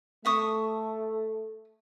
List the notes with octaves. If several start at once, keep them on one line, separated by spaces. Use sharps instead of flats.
A3 E5 C#6 D#6